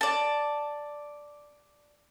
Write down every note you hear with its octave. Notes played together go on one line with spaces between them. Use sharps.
D5 A5